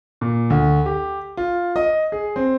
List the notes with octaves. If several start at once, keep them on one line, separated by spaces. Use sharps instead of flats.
A#2
D2
G4
F4
D#5
G#4
C4